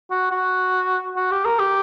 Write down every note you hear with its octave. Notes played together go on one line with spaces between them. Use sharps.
F#4
F#4
F#4
G4
A#4
G4